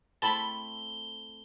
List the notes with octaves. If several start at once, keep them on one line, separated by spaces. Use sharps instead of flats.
A3 C4 E4 A5 B5 G7